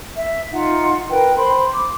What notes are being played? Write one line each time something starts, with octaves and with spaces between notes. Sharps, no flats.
E5
D#4 F4 F#5
A#4 B4 G5
C5 B5 C6
D6